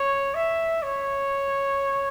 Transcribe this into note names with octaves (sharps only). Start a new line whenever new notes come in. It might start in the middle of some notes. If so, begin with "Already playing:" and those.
Already playing: C#5
E5
C#5